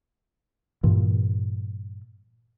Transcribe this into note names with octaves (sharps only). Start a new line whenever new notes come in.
G2 A#2 E3